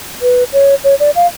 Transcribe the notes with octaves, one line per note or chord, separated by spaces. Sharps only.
B4
C#5
C#5
D5
F5